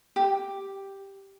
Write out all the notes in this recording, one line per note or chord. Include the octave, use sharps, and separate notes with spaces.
G4